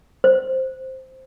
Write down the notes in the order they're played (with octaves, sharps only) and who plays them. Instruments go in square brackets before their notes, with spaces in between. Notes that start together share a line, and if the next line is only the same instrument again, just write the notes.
[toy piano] C5